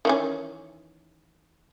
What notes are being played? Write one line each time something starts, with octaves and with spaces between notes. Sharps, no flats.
D#3 E3 C#4